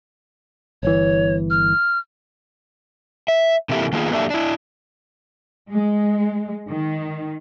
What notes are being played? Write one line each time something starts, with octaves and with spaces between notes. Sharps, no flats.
G1 E3 C#5
F6
E5
C3 E3 A#3 E4 G4 A4
D#3 A#3 B3 F4 G#4
F#3 A#3 D4 G4 A4 E5
D4 E4
G#3
D#3